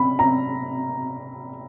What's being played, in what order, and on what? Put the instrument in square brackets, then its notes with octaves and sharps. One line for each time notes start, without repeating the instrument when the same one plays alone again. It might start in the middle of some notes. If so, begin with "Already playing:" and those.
Already playing: [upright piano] B5
A#5